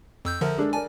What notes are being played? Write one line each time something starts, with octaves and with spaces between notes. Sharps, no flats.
F2 E6 G6
D3 F3 A4 A#4 E5
G#3 D4 A4
A#4 D5 G#5 A5